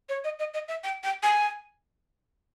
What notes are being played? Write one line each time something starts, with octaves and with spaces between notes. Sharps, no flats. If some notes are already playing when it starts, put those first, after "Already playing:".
C#5
D#5
D#5
D#5
E5
G5
G5
G#5